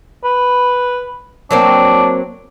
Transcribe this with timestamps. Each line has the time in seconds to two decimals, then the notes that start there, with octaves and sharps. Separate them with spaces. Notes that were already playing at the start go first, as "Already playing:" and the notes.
0.24 B4
1.51 F#3 A#3 C4 D4